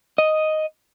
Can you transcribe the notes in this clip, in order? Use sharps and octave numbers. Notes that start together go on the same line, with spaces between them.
D#5